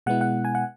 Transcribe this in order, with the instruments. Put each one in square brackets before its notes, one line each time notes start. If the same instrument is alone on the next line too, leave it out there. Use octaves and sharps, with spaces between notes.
[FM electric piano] B2 G#3 B3 E4 F#5
F#5
G#5
F#5